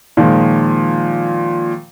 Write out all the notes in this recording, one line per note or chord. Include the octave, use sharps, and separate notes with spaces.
A#2 D#3 F3 G#3